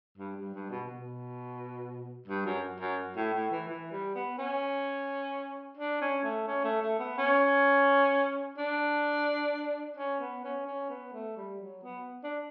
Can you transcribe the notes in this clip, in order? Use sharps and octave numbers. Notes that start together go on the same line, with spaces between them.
G2
G2
G2
B2
B2
G2
F#2
F#2
A2
A2
E3
E3
G3
B3
C#4
D4
C#4
A3
C#4
A3
A3
B3
C#4
D4
C#4
B3
C#4
C#4
B3
A3
G3
F#3
B3
D4